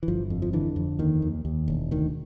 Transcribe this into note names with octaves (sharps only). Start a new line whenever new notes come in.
E3
G1 F3
F2
F3
D3 E3
F2
D#2 D#3
D#2
D#2
E1
D2 D#3